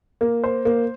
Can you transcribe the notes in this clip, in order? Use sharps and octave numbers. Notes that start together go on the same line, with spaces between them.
A#3
C5
A#3